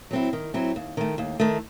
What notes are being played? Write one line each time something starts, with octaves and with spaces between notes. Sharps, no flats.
F#3 C4 E4
D#3
F#3 C4 E4
D#2
D#3 A3
D#2
D#3 A3